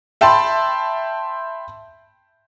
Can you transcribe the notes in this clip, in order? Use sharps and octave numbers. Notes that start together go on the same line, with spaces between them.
E5 G5 A5 B5 C6